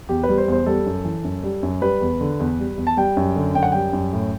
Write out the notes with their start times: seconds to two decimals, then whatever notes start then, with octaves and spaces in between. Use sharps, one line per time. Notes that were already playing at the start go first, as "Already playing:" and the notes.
0.09 E2 G4
0.23 B4
0.29 G3
0.38 C5
0.48 E2 C5
0.66 G3 A4
0.86 F#2
1.05 E3
1.24 F#2
1.43 G3
1.63 F#2
1.82 G3 B4
2.01 E2
2.21 D3
2.40 E2
2.59 G3
2.77 E2
2.87 A5
2.97 G3 G5
3.17 F#2
3.36 D3
3.55 F#2 G5
3.63 F#5
3.72 G3 G5
3.93 F#2
4.13 A2